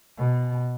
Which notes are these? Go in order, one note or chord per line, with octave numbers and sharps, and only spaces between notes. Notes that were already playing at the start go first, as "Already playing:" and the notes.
B2